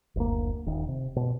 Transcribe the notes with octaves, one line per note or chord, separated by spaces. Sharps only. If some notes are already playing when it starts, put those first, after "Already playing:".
F#1 D2 A#3
D#1 D#3
C3
B2